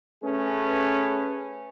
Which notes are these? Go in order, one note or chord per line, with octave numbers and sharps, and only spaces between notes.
A3 C#4 G#4 B4